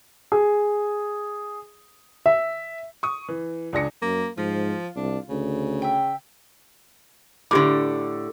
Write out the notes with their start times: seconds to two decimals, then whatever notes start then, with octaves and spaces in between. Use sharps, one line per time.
0.32 G#4
2.26 E5
3.03 C#6 D#6
3.29 E3
3.73 C#2 D4 G#4 A#6 C#7
4.02 F#2 A#3
4.38 G#2 F3 F4
4.96 C2 D4
5.29 D2 C#3
5.82 E5 G5
7.51 A2 D3 G4 D6